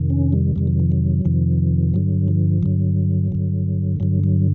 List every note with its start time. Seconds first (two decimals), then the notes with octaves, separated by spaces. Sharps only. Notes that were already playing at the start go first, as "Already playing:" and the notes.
Already playing: F2 C3 D#3
0.10 C#4
0.33 G3
0.56 F2 C3 D#3 G3
0.67 F#3
0.80 F3
0.92 F#3
1.25 F2 C3 D#3 F3
1.94 G2 D3 F#3
2.28 F3
2.63 G2 D3 F#3
3.32 G2 D3
4.00 G2 D3 F#3
4.24 F#3